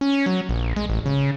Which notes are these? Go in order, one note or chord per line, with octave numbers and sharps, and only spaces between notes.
C#4
F#3
A#1
G#3
A1
C#3